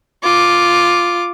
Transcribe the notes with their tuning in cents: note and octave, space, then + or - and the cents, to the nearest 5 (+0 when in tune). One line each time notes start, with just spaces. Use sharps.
F4 +0 D6 +0